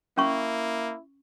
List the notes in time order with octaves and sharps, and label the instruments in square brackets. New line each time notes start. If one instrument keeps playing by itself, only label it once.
[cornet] A#3 [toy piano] C#4 C#6 [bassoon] E4